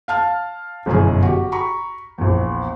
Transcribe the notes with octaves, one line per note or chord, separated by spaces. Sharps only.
F5 A5 F6
G1 F#2 B2 E3 G#4
F#4 G4
A#5 B5 C#6
A#1 E2